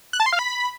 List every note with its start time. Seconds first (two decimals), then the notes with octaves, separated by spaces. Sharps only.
0.13 F#6
0.20 A5
0.26 C6
0.33 F5
0.39 B5